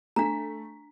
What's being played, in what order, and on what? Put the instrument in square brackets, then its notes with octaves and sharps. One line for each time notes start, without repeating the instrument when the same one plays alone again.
[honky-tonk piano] A3 B6 [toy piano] D4 A#5